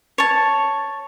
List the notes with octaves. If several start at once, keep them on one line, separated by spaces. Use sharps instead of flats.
C#5 A5